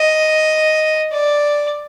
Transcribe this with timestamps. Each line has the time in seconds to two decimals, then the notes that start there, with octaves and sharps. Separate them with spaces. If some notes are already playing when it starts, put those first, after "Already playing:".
Already playing: D#5
1.12 D5